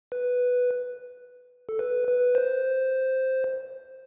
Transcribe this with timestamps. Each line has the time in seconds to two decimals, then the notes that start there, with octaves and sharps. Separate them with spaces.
0.12 B4
1.69 A4
1.79 B4
2.08 B4
2.35 C5